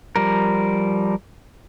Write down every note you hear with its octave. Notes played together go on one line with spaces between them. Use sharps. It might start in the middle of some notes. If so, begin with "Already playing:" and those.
F3 G3 A#4